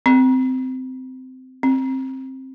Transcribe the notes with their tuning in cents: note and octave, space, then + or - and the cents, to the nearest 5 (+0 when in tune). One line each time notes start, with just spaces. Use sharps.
C4 -20
C4 +15